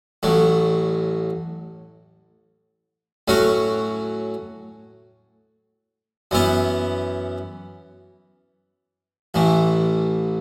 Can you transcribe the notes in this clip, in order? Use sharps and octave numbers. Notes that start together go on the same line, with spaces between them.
A1 A2 F#3
A2 F#3 C#4 F#4
F#2 E3 B3 E4
A1 A2 E3